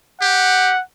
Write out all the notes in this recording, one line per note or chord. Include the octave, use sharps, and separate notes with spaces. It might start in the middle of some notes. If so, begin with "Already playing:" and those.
G4 F#5